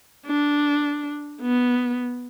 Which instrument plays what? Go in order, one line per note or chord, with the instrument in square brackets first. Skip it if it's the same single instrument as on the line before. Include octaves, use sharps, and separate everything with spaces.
[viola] D4
B3